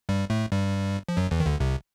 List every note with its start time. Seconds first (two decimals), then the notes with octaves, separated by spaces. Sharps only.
0.09 G2 G3
0.30 A2 A3
0.52 G2 G3
1.08 F3
1.17 F#2 F#3
1.31 E2 E3
1.40 D#3
1.46 D2 D3
1.60 C2 C3